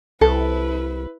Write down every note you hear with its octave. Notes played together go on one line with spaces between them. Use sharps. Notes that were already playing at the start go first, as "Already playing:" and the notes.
C2 E4 A4 B4